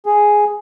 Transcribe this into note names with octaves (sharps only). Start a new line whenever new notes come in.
G#4